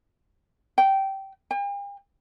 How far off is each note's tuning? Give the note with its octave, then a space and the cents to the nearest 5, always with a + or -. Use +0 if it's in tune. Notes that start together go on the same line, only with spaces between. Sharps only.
G5 -15
G5 +45